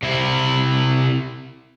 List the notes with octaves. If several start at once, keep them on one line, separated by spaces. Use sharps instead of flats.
C3 E4